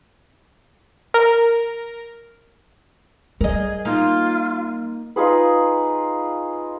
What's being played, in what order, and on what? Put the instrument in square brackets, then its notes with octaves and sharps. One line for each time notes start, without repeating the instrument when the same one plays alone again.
[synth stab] A#4
[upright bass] G3 [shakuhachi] G#4 [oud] A#4 D#5
[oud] A#3 D#4 [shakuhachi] F4
[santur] D#4 F4 G#4 B4